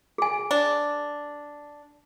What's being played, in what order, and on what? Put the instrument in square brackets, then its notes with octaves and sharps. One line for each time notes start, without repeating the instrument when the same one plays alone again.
[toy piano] G#4 G#5
[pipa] D4